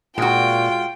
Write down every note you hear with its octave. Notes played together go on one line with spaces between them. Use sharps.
A#2 G#3 F4 F#4 G5